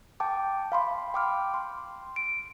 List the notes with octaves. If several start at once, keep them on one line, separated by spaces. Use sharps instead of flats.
G5 A5 D6
F5 B5 C6
G5 D6 F6
C6
D7